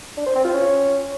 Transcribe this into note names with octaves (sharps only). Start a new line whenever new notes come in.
D4
C5
C4
F4
C#4